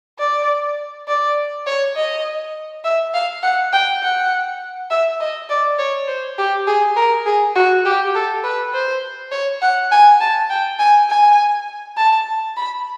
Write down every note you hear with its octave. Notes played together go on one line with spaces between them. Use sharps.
D5
D5
C#5
D#5
E5
F5
F#5
G5
F#5
E5
D#5
D5
C#5
C5
G4
G#4
A#4
G#4
F#4
G4
A4
B4
C5
C#5
F#5
G#5
A5
G5
G#5
G#5
A5
B5